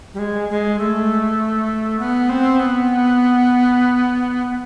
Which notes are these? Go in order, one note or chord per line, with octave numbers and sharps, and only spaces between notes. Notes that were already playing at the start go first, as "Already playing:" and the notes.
G3
G#3
G#3
A3
B3
C4
B3